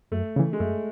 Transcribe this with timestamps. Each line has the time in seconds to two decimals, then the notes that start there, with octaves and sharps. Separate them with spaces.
0.12 F#2 A3
0.36 C#3 E3
0.53 G#3
0.60 F#2 A3